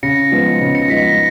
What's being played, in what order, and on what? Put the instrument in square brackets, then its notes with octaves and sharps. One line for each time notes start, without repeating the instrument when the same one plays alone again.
[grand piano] C#3 [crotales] A#6 C#7
[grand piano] F3 G#3 B3 D#4
C#3
[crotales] A#6 C#7
[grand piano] F3 G#3 B3 D#4 [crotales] B6
[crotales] A#6